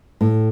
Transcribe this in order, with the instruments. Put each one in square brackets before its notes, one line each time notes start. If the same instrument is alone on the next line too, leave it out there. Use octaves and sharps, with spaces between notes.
[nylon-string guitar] A2